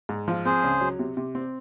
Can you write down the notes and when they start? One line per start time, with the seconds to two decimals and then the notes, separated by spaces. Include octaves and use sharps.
0.09 G#2
0.28 F3
0.45 C4 G#4 C5
0.63 C#2
0.81 F#3
0.99 C3
1.17 C3
1.35 C4